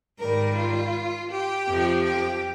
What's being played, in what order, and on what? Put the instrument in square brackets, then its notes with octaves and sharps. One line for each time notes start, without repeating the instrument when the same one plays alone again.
[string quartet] G#2 D#3 G3 A#4
F4
G4
F2 C3 F3
G4